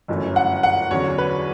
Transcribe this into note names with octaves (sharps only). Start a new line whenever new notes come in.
G1 F#2 E3 A3 C#4
F#5
F#5
E2 D3 F#3 C#4 C#5
B4